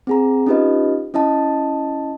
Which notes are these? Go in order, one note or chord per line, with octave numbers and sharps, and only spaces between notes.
C4 G#4 A#5
C#4 D#4 F4 G4 B4 D#5
C#4 E4 D#5 A5